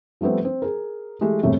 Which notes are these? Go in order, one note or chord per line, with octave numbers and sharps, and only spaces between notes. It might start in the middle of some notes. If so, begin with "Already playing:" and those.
F3 G3 A3 B3 C4
C4
G#4 A#4
E3 G#3 A3 G4
E1 G2 C3 G3 A3